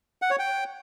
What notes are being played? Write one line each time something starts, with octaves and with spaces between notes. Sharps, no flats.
F#5
C#5
G5